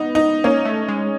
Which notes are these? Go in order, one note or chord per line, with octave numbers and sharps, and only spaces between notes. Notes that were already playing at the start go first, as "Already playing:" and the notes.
Already playing: B3 D#4
D#4
A#3 C#4
A3
G#3